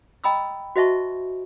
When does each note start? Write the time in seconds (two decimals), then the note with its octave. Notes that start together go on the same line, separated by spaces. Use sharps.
0.24 D#5 G5 A#5 B5 D#6 E6
0.76 F#4 C5 D#5 E5 A5 C#6